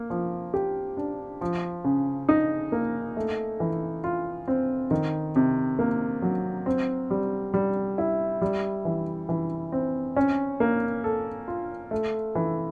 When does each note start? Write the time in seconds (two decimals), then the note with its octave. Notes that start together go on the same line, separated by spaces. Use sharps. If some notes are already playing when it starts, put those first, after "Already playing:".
Already playing: A#3
0.10 F3
0.54 G4
0.97 D4
1.41 F3
1.84 C#3
2.29 D#4
2.72 A#3
3.17 A3
3.60 E3
4.04 F4
4.48 C4
4.91 D#3
5.36 C3
5.79 A#3
6.22 F#3
6.66 C4
7.10 G3
7.54 G3
7.98 E4
8.42 G3
8.85 E3
9.29 E3
9.72 C4
10.16 C#4
10.60 A#3
11.04 A4
11.48 F4
11.91 A3
12.35 E3